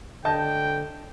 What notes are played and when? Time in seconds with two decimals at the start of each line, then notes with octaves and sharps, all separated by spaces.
0.25 D3 D#5 G5 A5 G6